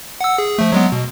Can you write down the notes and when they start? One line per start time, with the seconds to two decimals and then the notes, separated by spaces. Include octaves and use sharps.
0.21 F#5 E6
0.38 G#4
0.59 F3 A3
0.72 F#3 G#3 B3
0.92 B2